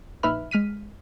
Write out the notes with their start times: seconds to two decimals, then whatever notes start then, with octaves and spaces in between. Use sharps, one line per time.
0.23 A#1 D#4 B4 E5 B5 F6
0.51 G#3 F6 B6 D#7